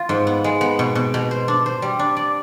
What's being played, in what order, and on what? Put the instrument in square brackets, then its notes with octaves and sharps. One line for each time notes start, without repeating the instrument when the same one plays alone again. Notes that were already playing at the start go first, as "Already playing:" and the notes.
Already playing: [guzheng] F4
G#2
B3
G#3
B3
B2
B2
B2
C5
D4
C5
G3
D4
D5